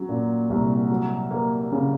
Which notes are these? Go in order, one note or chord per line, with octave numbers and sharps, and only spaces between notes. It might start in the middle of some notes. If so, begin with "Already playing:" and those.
Already playing: F#3 C#4
A#2
C2
F#3
A#3
C#3